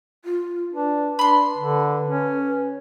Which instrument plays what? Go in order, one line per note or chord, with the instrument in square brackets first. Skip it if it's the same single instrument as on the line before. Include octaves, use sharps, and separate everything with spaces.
[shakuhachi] F4
[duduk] D4 [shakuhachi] B4
[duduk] D4 [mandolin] B5 C6
[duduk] D3
C#4
[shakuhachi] B4